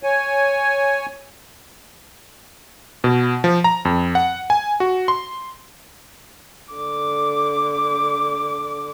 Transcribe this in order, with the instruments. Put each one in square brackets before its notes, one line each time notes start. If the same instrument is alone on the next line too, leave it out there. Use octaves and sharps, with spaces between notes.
[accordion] C#5 G#5
[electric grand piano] B2
F3
A#5
F2
F#5
G#5
F#4
C6
[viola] D3 D6